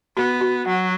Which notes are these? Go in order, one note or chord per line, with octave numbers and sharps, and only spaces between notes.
B3 F#4
F#4
F#3 F#5